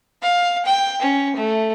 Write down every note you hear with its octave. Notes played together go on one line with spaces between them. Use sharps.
F5
G5
C#4
A3